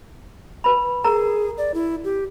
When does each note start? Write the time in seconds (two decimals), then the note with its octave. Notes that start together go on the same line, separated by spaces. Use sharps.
0.64 B4 B5
1.04 G#4 A#4 A#5
1.58 D5
1.74 E4
2.04 G4